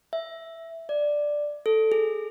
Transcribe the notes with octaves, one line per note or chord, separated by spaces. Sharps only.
E5
D5
A4
G#4